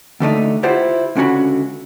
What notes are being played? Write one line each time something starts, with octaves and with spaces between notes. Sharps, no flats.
D2 D3 A3 D#4
E4 F4 G4 C5 F#5
C#2 D3 C#4 F#4 B5